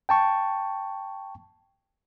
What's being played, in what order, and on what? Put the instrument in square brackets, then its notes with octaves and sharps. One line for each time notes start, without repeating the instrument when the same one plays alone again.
[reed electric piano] G5 A5 C#6